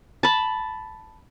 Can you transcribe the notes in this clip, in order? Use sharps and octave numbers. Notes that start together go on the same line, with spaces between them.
A5 B5